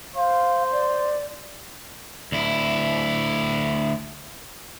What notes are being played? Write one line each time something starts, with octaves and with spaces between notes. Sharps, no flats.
C5 F5
D5
D2 E4